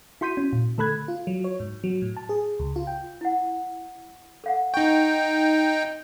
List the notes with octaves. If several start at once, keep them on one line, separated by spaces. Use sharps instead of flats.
E4 F#4 C6 G6 B6 D#7
C#4
A#2
D3 A3 A4 B5 F#6 G#6
F4
F#3
C#5
G#2
F#3
A2
A5
G#4
C#2
F4
G5
E4 F#5
A4 F5 F#5
D#4 G5 C#6